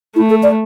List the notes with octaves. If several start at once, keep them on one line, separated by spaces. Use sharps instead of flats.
A3 E4
A4
D5